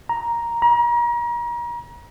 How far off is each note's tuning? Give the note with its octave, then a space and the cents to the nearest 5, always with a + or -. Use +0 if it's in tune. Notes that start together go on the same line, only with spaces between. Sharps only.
A#5 +5
A#5 +35